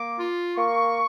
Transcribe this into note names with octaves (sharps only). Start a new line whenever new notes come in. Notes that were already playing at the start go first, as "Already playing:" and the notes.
Already playing: A#3 D6
F4
A#3 C#6